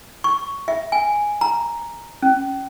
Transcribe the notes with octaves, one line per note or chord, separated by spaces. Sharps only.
C#6
E5
G#5
A#5
C#4